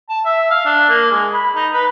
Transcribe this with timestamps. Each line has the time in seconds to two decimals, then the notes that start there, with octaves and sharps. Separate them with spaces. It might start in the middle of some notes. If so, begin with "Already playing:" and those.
0.09 A5
0.25 E5
0.50 F5
0.66 D4
0.89 A#3
1.11 G#3
1.33 B5
1.55 D#4
1.73 B4